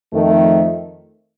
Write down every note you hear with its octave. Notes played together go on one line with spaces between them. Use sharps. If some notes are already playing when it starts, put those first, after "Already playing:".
F2 D#3 A3